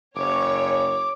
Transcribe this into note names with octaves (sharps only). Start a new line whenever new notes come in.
F#1 C#5 D6